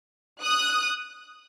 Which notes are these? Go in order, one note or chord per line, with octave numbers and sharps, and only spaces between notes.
D#6 F#6